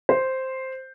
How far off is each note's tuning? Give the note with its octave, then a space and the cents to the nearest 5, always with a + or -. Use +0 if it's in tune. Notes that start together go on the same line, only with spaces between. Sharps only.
C5 +0